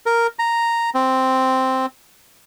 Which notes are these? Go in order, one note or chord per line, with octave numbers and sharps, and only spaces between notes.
A#4
A#5
C4